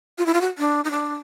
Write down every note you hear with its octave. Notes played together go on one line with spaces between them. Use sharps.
F4
E4
F4
F#4
D4
D#4
D4